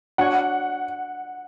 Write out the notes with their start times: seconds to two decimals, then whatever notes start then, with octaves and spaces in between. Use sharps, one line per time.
0.18 D4 F#4 C#5 F#5 G#5 C#6